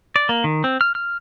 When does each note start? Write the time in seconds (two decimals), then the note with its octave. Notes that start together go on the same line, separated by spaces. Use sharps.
0.16 D5
0.29 A#3
0.44 D#3
0.64 C4
0.81 F6
0.95 F6